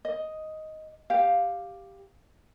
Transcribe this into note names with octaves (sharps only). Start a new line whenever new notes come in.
D#5
G4 F5